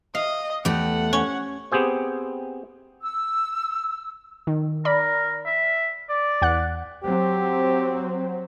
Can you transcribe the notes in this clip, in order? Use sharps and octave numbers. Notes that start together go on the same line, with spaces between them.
D#5 F5
E2 A3 G4 F#5
C#4
B3 C4 G4 G#4 C5
E6
D#3
A#4 D5 B5
E5
D5
E2 F#5 F#6
F#3 C4 G4 C5